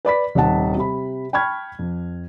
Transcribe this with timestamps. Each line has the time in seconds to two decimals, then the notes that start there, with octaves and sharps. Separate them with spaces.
0.05 B4 D5 B5 B6
0.35 D#1 C3 D#3 F#5 A5
0.76 C3 B5
1.33 G5 A5 B5 C#6 F6 G#6
1.79 F2